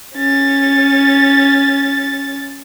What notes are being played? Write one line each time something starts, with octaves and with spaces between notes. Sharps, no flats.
C#4 A6